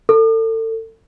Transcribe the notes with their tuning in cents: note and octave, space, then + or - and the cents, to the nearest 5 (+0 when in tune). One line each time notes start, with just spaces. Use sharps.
A4 +30